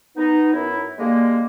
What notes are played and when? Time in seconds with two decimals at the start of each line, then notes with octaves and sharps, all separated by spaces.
0.17 B3 D#4
0.53 F#2 E4
0.99 D3 G3 G#3 A#3